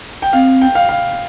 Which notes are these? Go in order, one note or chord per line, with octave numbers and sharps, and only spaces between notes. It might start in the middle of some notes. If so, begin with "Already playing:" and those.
G5
C4 F5
G5
F5
F5